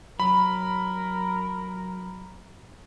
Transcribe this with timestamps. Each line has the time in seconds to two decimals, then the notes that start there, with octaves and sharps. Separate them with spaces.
0.20 F#3 A#4 B5